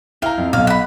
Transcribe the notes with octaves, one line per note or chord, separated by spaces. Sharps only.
E4 F5 G5 A#5
F2
B1 F5
F#5 B5